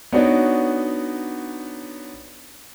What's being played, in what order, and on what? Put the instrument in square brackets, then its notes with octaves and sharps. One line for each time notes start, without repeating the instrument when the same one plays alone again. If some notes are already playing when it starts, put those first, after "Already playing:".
[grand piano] B3 D4 D#4 F#4 C#5 D5